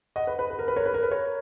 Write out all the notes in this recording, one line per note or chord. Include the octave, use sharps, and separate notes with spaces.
D#5 F#5
B4
B4
B4
A#4
B4
A#4 C#5
B4
A#4
B4
A#4 C#5